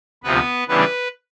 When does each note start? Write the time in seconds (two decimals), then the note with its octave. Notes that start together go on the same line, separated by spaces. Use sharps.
0.24 D2 C3 F3 B3 B4
0.68 C#3 E3 G3 B3 D4 B4